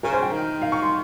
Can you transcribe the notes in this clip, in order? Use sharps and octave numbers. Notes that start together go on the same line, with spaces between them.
C#3 A#4
C5
G5
D#3
F5
C#6
C6